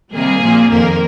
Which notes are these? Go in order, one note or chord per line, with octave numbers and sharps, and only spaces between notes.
C3 D#3 G3 A#3 G#4
A#2 F3 A#3
F2 D#3 A#3 A#4